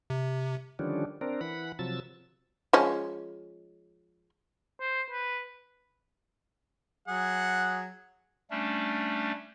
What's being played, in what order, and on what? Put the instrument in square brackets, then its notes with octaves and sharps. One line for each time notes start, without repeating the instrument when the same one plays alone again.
[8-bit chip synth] C3
[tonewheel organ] D3 D#3 F3 G3 C#4 D4
C4 D4 A#4
E3 F#5 B5
C3 F3 F#3 E6 A6
[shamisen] F3 G#3 C#4
[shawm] C5
B4
[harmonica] F#3 G#4 F#5
[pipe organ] G3 A3 C#4 D4